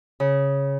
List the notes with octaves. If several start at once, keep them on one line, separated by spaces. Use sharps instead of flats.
C#3